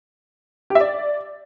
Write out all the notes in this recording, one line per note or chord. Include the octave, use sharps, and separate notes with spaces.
G4
E5
D5